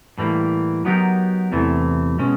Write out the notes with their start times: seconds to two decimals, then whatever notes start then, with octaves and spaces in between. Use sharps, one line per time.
0.18 A2 E3 G3 A#3
0.85 F#3 B3 D#4 G4 A#4
1.52 E2 C3 E3 A3
2.19 B2 G#3 C#4